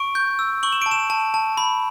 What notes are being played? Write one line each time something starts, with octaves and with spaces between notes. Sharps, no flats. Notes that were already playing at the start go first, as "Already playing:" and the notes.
Already playing: C#6 D7
G6
E6
C#6 F#7
E7
D7
A5
E7
A5
A5
B5